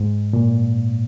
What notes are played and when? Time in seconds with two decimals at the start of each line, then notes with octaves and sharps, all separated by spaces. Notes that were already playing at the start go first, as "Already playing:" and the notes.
Already playing: G#2
0.33 A#2